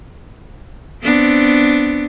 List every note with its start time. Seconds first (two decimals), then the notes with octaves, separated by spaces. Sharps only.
1.03 B3 C4 D4